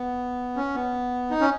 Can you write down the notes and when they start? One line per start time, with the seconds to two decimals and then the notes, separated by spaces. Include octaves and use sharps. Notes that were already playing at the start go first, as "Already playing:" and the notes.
Already playing: B3
0.56 C#4
0.75 B3
1.31 D#4
1.41 C#4